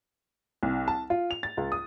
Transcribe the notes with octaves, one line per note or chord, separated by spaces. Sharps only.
C2
A5
F4
F7
A6
C#2
D#6